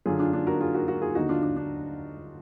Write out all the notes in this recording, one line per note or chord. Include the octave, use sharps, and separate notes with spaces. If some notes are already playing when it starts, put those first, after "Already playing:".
F#2 D3 F4 G#4
D4 F4
D4 F4
F#4 A#4
F4 G#4
F#4 A#4
F#4 A#4
F4 G#4
D#2 D3 D#4 F#4
D4 F4
D4
D4